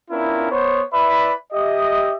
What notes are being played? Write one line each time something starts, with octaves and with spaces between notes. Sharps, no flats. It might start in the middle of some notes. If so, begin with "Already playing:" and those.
B3 C#4 D4 E4 F4 A#4
B3 C5 C#5
E4 B4 D5 E5 B5
G4 D#5 E5